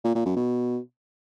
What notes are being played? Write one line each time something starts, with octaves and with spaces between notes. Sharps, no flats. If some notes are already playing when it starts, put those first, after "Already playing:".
A#2
A#2
F#2
B2